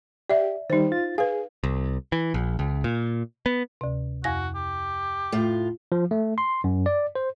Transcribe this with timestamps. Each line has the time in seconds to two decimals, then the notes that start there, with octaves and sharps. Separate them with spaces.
0.30 G4 D5 E5
0.70 D#3 G3 D#4 C5
0.92 F4 A6
1.18 G#4 B4 F5
1.64 C2
2.12 E3
2.34 A#1
2.59 C#2
2.84 A#2
3.46 B3
3.81 D2 C3
4.24 F2 F#4 G#5 A#6
4.55 G4
5.32 A2 F4
5.92 F3
6.11 A3
6.38 C6
6.64 F#2
6.86 D5
7.15 C5